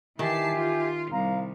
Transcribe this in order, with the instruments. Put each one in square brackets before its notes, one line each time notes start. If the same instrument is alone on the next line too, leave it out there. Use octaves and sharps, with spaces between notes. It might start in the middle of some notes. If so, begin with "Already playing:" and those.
[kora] D#3 [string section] E3 A5 C7 [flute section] G4 E5 G#5
[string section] F4
[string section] C2 [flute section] F5 A#5